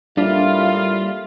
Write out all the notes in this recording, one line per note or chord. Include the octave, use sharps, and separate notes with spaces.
A2 G3 A#3 D4 E4 F4